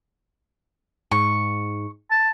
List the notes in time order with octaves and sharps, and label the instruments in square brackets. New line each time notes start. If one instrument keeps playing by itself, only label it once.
[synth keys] G#2 [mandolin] C#6
[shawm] A5